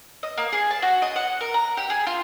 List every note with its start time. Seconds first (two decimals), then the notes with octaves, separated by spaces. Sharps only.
0.23 D#5
0.37 A#3
0.53 G#4
0.71 A5
0.82 F#4
1.02 D#5
1.16 F#5
1.41 A#4
1.54 A#5
1.77 G4
1.90 G#4
2.07 F4